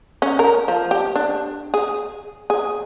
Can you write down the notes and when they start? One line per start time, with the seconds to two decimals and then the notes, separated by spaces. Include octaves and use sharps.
0.22 C#4
0.39 A#4
0.68 F3
0.91 G4
1.16 D4
1.74 G#4
2.50 G#4